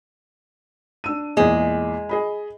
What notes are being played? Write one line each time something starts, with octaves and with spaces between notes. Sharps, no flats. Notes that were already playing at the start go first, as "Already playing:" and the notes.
D4 E6 D#7
E2 A#2 G#3
G#4 D#5 B5